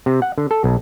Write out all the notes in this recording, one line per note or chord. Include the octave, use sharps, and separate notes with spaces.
C3
F#5
D3
A4
B1